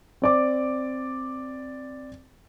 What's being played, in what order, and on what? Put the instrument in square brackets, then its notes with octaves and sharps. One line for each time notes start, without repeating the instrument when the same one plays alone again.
[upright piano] C4 D5 D6